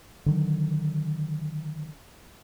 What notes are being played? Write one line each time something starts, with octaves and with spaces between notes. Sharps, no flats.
D3 D#3 F#3